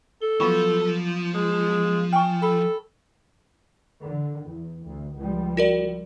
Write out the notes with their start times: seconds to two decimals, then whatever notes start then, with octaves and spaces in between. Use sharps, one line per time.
0.22 A4 G7
0.40 F3 F#3 B3 F5 B5 C#6 D6
1.34 G#3
2.13 G5 G#5 C#6 F6
2.42 A4 B5
4.03 D3
4.47 E2
4.84 D2
5.16 C#2 F3 G3
5.57 F#4 A#4 D5